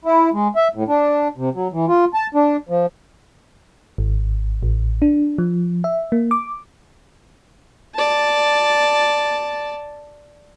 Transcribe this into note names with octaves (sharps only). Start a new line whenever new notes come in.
E4
G#3
E5
A2
D4
C3
F#3
E3
F4
A5
D4
F3
G#1
A1
D4
F3
E5
A#3
D6
D5 A5